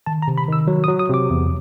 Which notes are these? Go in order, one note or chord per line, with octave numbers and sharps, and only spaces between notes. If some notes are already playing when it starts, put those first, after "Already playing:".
D#3 A5
A#5
C3
B5
D#3 E6
F#3
D#6
F#3
D#6
C3 D6
E2